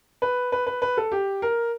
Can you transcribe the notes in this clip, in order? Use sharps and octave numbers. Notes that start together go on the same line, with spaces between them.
B4
B4
B4
B4
A4
G4
A#4